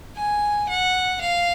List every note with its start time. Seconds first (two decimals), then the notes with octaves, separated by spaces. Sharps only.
0.16 G#5
0.69 F#5
1.21 F5